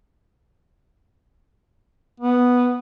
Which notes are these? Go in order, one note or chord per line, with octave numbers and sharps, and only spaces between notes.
B3